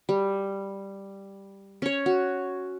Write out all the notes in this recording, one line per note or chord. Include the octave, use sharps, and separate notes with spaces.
G3
C#4 C#5
F#4